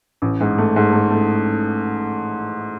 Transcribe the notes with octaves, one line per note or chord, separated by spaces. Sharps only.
A1
G#2
A3
G#2
A3
A3